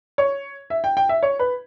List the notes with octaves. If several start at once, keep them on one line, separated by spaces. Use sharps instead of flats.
C#5
E5
G5
G5
E5
C#5
B4